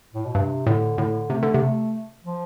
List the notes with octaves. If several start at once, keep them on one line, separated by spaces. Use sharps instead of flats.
A2
B2
G2 C3
A2 D3
A2 D3
C3 A3
D3
C3
A3
F3